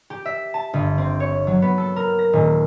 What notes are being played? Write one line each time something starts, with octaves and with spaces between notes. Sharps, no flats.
G4
E5
A5
G1
C4
C#5
F#3
B3
A4
A#4
A#6
D#1